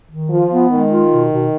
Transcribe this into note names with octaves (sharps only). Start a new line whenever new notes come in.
D#3
F3 F4
B3
D#3 G#3
F4
B2
B2